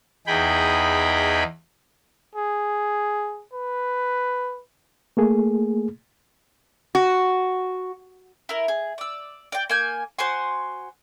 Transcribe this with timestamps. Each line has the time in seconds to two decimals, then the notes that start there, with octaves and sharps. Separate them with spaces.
0.27 E2 D#4 G#4 G5 B5
2.36 G#4
3.53 B4
5.17 A3 A#3 G#4
6.95 F#4
8.49 E4 A#4
8.68 G#4
8.98 D5 E6
9.52 D5 G5
9.69 A#3 G#5 G6
10.19 F#4 C5 G#5 C6